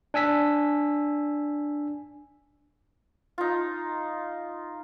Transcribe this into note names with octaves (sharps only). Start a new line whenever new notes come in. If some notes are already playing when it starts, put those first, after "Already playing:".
D4 G#5 E6 B6
D#4 F4